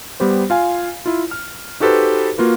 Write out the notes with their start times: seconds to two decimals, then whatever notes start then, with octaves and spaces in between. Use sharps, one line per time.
0.20 G3 B3 G4 C5
0.50 F4 F5 G#5
1.06 E4 F4
1.31 F6
1.80 D#4 F#4 G4 A4 B4 C5
2.38 A#3 F4 F#4 B4